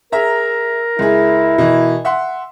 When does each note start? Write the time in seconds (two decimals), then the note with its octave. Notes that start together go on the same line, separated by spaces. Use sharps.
0.12 G#4 A#4 E5 A#5
0.99 C#2 E4 G#4
1.58 B2 E3
2.05 E5 F#5 C6